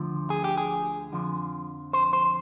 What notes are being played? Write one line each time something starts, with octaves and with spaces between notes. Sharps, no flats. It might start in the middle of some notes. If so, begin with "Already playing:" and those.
Already playing: D2 D3 F3
G#4
G4
G#4
F2 D3 F3
C5
C5